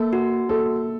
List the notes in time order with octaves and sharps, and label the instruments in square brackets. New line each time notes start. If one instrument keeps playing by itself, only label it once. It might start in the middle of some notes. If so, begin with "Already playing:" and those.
Already playing: [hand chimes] A#3 [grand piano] A4
[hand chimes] F#4
[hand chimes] A#3 [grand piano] A4